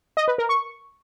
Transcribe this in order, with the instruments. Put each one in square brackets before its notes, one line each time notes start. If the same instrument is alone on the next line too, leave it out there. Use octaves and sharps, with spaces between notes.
[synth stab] D#5
B4
A#4
C#6